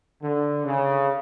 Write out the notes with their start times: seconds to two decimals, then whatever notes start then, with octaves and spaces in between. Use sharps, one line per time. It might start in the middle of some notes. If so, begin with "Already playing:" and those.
0.22 D3
0.65 C#3